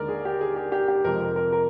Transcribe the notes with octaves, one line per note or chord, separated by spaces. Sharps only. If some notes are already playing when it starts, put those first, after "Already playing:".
Already playing: D#2 D3 G#3 A#4 D5
G#4
G4
G#4
G4
G4
G4
F2 C3 F3 G#3 A#4
A#4
A#4
A#4